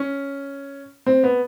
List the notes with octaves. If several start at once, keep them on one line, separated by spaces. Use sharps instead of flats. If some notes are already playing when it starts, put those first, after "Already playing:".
Already playing: C#4
C4
B3